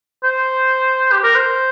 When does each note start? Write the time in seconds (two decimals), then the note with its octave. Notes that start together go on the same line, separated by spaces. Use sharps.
0.23 C5
1.12 G4
1.23 A#4
1.35 C5